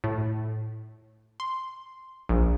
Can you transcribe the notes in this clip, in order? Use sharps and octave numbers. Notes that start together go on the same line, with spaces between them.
A2
C6
A#1